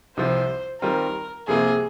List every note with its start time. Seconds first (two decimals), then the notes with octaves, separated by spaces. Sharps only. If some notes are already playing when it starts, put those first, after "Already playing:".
0.17 C2 C3 F3 C5
0.81 D#3 G3 C4 F4 A#4
1.47 C2 C3 F3 A#3 F4 G#4